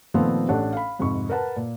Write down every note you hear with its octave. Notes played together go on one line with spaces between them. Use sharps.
A#2 D#3 F3 A3 B3 C4
A1 D4 G4 A4 C#5 F#5
F5 B5
F2 G#2 C3 B5 C#6
A#4 B4 F#5 A5
A#2